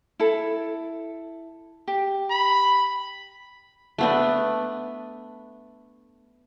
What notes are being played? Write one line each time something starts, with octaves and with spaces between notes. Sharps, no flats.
E4 A4
G4
B5
A3 B3 D4